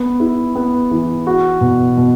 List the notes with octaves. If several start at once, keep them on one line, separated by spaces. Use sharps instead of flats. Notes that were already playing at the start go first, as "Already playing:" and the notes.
Already playing: B3
E4
B3
E3
F#4
B2
B2